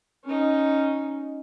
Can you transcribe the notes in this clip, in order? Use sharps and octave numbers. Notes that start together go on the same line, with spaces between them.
C#4 D#4